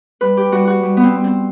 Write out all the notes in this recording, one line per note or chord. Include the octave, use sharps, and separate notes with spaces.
G3 B4
G4
G3 F#4
F#4
G3
B3
C4
G3
C4